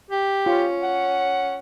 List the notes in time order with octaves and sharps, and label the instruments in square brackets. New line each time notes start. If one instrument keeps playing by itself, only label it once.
[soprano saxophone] G4
[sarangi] C#4 [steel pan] F4
[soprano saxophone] F#5